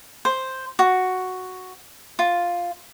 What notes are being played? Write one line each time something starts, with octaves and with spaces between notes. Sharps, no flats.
C5
F#4
F4